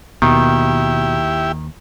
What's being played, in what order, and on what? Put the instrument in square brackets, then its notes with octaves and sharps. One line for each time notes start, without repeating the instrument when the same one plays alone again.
[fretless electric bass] D#2 [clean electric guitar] B2 [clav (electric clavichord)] D#3 [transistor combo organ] E4 G4